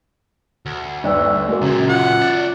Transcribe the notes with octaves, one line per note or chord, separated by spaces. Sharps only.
D2
G1 D#2 D5 E6
G#3 A#3 F#4 G#5
C#2 F#2 A#2
F4 F#5
C#4 D5